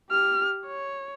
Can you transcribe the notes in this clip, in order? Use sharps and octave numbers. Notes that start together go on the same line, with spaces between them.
G4 F6
C#5